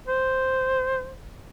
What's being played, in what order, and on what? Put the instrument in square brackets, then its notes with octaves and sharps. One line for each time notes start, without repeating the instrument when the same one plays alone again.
[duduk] C5